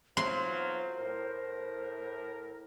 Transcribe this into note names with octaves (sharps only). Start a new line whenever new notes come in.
B1 F#3 F4 C5 C6
A2 A#4